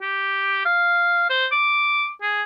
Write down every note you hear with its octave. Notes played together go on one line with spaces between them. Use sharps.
G4
F5
C5
D6
G#4